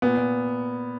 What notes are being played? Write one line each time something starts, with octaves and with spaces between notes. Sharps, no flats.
A#2 B3
A#2